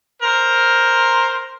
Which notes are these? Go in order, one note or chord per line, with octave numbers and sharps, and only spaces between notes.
A#4 C5